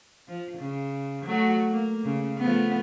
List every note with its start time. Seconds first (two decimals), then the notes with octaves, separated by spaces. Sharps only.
0.28 F3
0.57 C#3
1.25 F#3 A3 F#4
1.70 A#3
2.04 C#3
2.38 F3 A3 B3